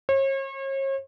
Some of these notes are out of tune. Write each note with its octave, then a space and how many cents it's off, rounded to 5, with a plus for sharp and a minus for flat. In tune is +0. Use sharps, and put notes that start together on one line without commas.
C#5 -40